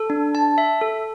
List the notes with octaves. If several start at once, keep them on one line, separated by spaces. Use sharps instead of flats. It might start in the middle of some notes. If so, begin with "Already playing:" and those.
Already playing: A4
D4
A5
E5
A4